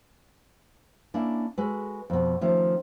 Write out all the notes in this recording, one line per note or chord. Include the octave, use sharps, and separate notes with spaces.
A#3 C#4 D4 E4
G#3 F#4 A4 B4
F2 B2
D#3 F3 A3 C#4